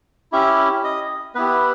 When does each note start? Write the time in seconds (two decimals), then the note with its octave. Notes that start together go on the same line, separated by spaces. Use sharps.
0.32 C#4 E4 G4 E5
0.84 D#5
1.35 B3 E4 G4 B4